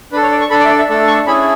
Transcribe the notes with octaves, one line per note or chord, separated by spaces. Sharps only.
D4 A4 B4
C#5
D5
C#6
D4 A4 B5
D5
E5
D5
E5
A3 D4 A4
C#6
C#4 E4 G#4 B5